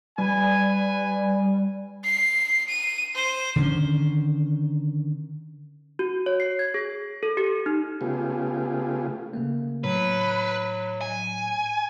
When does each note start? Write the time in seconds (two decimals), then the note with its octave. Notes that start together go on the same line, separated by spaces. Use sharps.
0.18 G3 B4 G#5
2.04 C7
2.68 D#7
3.15 C5
3.56 D3 D#3 A#3 C#4
5.99 F#4
6.26 C#5
6.40 C7
6.59 G#6
6.74 G#4
7.23 A4
7.37 G4
7.66 D#4
8.01 C#3 A3 B3 F4 G4 G#4
9.33 C#3 A3 A#3
9.84 A2 F#3 B4
11.01 G#5